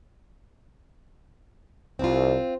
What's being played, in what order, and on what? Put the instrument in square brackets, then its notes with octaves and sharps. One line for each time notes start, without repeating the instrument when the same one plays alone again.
[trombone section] C2 [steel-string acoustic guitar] C4 F4